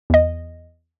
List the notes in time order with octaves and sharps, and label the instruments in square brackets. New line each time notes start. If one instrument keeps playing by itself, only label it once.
[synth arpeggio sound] E2 D#5